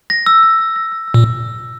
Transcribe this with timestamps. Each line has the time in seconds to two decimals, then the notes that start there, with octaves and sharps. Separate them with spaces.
0.10 A#6
0.26 E6
0.43 E6
0.59 E6
0.76 A#6
0.92 E6
1.08 E6
1.14 A#2